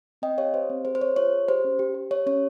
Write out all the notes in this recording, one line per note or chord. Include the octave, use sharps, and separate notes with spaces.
C4 D#5 G5
G4 C#5 F5
G4 C5
C4
G#4 C5
C5
G#4 C#5
F4 C#5
G#4
G4 C5
C#4
G4
G4
G4 C#5
C#4 C#5